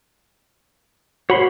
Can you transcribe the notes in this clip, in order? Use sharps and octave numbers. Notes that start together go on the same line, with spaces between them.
F#4 C#5 B5 C6